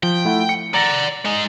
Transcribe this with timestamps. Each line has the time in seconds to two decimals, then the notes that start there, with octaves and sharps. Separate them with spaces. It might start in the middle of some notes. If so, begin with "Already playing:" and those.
0.03 F3 G5
0.25 A3 E4 F#5
0.49 C#7
0.74 D5 F#5 A#5 A6 A#6
1.25 G#3 D#4